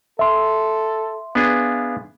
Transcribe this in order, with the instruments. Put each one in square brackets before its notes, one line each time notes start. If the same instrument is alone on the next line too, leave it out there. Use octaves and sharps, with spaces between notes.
[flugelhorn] A4 [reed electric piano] E5 C6
[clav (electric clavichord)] B3 D4 G#4 [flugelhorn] F5